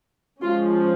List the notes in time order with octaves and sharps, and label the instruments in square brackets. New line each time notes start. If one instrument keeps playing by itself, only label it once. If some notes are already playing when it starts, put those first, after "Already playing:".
[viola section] F3 G#3 C#4 F4